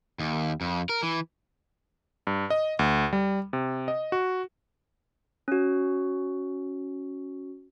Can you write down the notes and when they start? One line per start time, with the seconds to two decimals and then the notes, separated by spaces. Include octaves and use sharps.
0.19 D#2
0.61 F2
0.89 A#4
1.03 E3
2.27 G2
2.50 D#5
2.79 D2
3.13 G3
3.53 C3
3.88 D#5
4.12 F#4
5.48 C#4 F#4